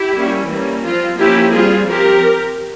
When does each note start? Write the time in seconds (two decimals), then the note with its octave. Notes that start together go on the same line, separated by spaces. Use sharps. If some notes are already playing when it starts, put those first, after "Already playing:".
Already playing: E4 G4
0.14 G3 A#3 C#4
0.49 E3 G3 A#3 C#4
0.84 F3 C4 F4
1.18 F3 A#3 C#4 E4 G4
1.53 G3 C4 F4 G#4
1.88 F3 C4 G4 A#4